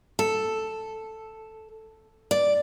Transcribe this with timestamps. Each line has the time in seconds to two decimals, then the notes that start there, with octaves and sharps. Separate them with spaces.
0.19 A4
2.31 D5